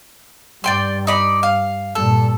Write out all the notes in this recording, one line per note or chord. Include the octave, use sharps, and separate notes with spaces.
G2 D5 G5 C6
D#4 D5 B5
F5
G2 A#2 A4